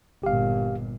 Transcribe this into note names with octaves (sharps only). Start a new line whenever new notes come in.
G1 A#2 G4 F5